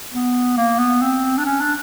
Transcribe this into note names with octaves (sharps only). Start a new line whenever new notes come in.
B3
A#3
B3
C4
D4
C#4
D4